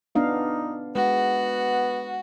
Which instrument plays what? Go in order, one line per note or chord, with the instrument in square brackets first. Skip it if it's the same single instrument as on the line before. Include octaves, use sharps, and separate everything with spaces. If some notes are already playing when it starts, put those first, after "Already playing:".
[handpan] B3 D4 F5 [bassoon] D#4
[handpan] G#3 [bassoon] B3 [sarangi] F#4